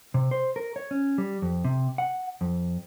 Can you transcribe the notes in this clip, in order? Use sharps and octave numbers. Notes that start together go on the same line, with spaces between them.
C3
C5
A#4
C#5
C#4
G3
F2
C3
F#5
F2